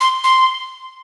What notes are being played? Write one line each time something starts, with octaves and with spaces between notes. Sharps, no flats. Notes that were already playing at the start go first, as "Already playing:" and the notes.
C6
C6